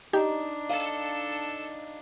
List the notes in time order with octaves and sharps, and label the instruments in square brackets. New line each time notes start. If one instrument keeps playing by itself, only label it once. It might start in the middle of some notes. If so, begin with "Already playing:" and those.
[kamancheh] D4 [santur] D#4 [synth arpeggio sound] G4
[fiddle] A4 [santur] F5